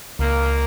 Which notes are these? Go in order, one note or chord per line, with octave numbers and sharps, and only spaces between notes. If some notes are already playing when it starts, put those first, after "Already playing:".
C#2 A#3